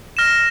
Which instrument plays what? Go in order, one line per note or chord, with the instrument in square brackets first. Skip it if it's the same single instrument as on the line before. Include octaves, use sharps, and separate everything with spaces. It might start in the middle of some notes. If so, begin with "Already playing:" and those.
[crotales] F6 A#6 E7